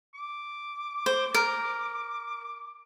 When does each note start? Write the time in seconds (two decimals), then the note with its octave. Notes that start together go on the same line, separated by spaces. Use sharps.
0.14 D6
1.06 C5
1.34 A#4